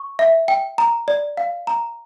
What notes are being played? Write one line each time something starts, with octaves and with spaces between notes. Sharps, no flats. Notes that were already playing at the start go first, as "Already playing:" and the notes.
Already playing: C#6
E5
G5
A#5
D5
F5
A#5